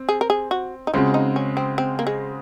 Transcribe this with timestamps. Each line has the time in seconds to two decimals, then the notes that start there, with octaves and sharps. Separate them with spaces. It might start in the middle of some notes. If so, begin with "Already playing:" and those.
Already playing: C4
0.09 G#4
0.21 A#4
0.30 G#4
0.51 F#4
0.87 D#4
0.94 C#3 G#3 C4 F4 F#4
1.14 D#4
1.36 C#4
1.57 C4
1.78 C4
1.99 A#3
2.07 G#3